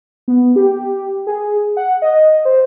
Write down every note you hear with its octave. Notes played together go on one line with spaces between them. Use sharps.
B3
G4
G#4
F#5
D#5
C5